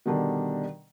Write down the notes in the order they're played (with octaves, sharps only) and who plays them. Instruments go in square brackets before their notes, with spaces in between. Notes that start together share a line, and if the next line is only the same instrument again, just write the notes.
[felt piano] B2 D3 D#3 G3 D4